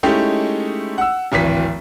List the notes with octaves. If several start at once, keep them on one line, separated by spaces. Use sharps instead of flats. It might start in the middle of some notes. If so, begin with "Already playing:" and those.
G#3 A3 C#4 D#4 E4 G4
F#5 E6
D1 G#1 E3 B6